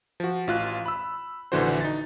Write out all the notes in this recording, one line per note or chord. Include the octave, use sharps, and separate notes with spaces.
F3 F#4
A1 F4 F#6
B5 E6
A#1 D3 E3 F#4 C5
D#4 A6